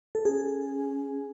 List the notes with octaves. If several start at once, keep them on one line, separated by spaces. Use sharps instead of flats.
A4
C#4 G#4